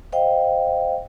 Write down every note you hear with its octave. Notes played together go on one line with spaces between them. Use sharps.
C5 D#5 F5 G5